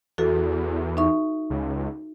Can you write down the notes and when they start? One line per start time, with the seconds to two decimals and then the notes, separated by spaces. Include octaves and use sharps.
0.18 E2 F#4 A4
0.97 D#4 E5 C#6
1.50 C#2